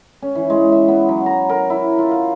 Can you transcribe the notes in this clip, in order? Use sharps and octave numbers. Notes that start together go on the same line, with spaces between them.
C#4
E3
G#3
E5
B3
F#3
A#5
A#4
E4
F4
F5